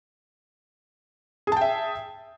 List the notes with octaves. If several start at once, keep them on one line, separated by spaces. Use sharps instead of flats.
G#4 E5 G5 A5